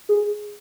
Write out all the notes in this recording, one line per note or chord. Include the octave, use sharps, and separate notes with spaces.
G#4